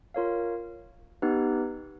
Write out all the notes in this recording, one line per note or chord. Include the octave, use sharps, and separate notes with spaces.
F4 A#4 C#5 F5
B3 D#4 G4 B4